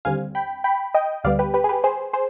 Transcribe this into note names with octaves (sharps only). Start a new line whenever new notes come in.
D#2 D3 G3 C4 F5 G#5
G5 B5
G5 B5
D#5 G5
D2 D3 G3 B3 D5 F5
G4 B4
G4 B4
G#4
G4 B4
G#4 C5
G#4 C5